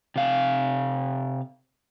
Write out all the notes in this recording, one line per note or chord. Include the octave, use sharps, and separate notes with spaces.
C3 F5